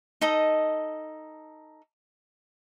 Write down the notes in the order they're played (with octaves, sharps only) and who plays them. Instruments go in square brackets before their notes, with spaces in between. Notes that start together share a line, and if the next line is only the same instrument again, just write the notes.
[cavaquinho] D#4 A4 D#5